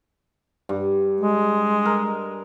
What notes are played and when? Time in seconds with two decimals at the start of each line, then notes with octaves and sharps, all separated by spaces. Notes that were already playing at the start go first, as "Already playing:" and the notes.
0.69 G2
1.21 G#3
1.85 A#4